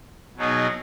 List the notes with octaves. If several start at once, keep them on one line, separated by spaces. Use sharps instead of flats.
B2 F#3 B3 D#4 G#4